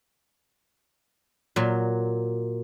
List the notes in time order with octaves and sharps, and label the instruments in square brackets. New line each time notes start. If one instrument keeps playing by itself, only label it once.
[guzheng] A#2 F#3